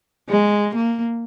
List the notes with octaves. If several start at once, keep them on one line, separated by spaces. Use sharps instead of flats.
G#3
A#3